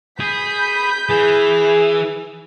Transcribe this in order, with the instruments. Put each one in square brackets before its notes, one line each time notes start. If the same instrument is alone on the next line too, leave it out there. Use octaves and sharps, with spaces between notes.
[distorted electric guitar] G#4 [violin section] B5 G6 B6
[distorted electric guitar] E3 [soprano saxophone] G#4